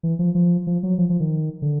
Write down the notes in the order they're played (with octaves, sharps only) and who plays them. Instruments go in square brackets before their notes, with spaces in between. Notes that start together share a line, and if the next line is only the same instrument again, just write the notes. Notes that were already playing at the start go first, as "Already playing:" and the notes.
[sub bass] E3
F3
F3
F3
F#3
F3
F3
D#3
D3